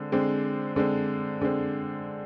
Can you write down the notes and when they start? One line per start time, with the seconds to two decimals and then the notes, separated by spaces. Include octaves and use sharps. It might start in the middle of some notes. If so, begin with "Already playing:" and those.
Already playing: D3 G#3 C4
0.12 D3 G#3 C4
0.76 D3 G#3 C4
1.41 D3 G#3 C4